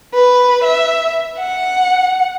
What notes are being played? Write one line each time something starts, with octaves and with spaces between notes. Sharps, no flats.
B4
E5
F#5